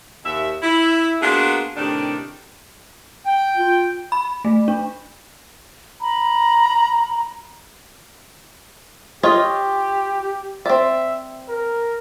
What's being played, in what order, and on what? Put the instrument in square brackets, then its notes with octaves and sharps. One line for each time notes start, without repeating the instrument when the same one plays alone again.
[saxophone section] D#2 E5
E4
A#3 B3 D4 F4 F#4 G#4
A2 C3 D#3 D4
[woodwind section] G5
[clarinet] F4
[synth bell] B5
A3
D4
[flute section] A#5 B5
[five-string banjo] F4 C#5 D#5 [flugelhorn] G4
[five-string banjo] C4 D5 [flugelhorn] E5
[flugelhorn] A#4